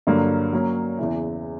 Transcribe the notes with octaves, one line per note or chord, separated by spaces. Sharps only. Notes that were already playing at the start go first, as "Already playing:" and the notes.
G2 D3 F#3 A#3
F#3 A#3 C#4
E2 C#3 E3